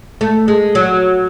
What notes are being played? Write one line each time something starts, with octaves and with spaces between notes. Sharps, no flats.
A3
G#3
F#3